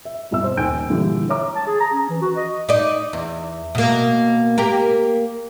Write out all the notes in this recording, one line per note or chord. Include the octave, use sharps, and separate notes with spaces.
E5
C2 B2 E5 E6
C5
D#1 D#4 G5 G#5 G6 D7
A#2 D3 E3 G3 G#3
C#5 E5 A#5 D6
A5
G#4
A#5
C#4
E3
F#4
D#5
D#4 D5
E2
B2 A#3
A#3 G4 A#4